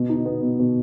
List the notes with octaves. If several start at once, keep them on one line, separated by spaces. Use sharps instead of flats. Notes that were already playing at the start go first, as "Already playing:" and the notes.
Already playing: B2
D#4
B3
B2
B2